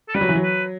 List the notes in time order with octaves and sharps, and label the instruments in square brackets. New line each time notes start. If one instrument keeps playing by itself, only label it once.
[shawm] A4
[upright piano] G3 [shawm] B4
[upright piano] F#3
E3
F#3
[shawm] B4